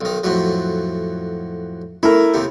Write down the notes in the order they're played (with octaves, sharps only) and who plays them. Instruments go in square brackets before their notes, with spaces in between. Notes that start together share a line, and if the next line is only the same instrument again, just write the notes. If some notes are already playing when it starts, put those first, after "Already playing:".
[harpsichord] B1 D#3
F2 A2 F#3
[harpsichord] A3 [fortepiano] E4 A#4
[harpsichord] D#2 C3